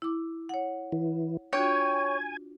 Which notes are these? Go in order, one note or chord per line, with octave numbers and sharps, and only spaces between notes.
E4 D6
C#5 F#5
E3
D4 F4 F#4 C#5 G5 G#5